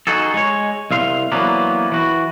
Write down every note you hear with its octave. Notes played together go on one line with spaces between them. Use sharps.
D#4 F#4 G#4 A4
G#3 C#5
C2 E5 F5 C6
E3 F#3 A#3 B3 D4
E3 F#4